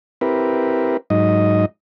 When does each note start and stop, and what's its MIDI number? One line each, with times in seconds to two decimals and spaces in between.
0.21 0.97 60
0.21 0.97 64
0.21 0.97 67
0.21 0.97 70
0.21 0.97 71
1.10 1.65 44
1.10 1.65 54
1.10 1.65 63
1.10 1.65 75